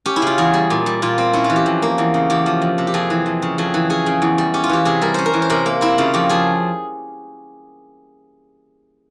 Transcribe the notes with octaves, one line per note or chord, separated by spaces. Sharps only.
C#4 G4
E4
C#3 F4
E2 G#4
G3
A#2
G3
A#2 F4
C4
C#4 E4
F4
E3
G4
F2
A#3
E2
C#3
E2 G4
F3
F2
C3
G4
F2 G#4
E3
F2
C#3
F2 G#4
E3
C#4 G#4
C#3
E2
G3
C#4 G4
F4
E3 G4
C3 G#4
G3 A#4
C#4 C5
A#4
E3
C5
C3 A#4
A#3
C4 E4
C#3 F4
F2 G4
F3 G#4